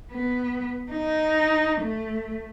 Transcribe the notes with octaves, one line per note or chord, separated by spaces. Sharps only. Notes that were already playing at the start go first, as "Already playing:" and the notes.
B3
D#4
A3